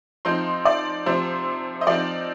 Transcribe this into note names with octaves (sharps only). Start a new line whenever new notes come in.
F3 C4 D#4 C6
D5
C3 F3 C4 C5
D#5
F3 C4 D#4 D5